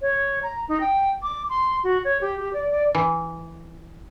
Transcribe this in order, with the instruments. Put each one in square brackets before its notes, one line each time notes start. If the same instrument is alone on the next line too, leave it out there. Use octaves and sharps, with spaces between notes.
[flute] C#5
A#5
D#4
G5
D6
C6
F#4
C#5
G4
G4
D5
D5
[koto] E3